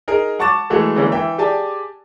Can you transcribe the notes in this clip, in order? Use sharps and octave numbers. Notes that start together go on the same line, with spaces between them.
D#4 G#4 A#4
F#5 A5 C#6 D6 A6 E7
E3 G#3 A3 F#4 A4
D3 E3 G#3 A#3 C#4
E3 E5 G5
G4 G#4 D5 G#5 A5